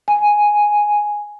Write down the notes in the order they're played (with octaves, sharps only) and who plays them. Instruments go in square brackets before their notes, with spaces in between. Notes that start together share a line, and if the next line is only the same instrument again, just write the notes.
[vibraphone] G#5